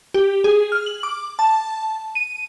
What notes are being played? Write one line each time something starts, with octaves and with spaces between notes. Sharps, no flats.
G4
G#4
F6
F#7
D6
A5
D#7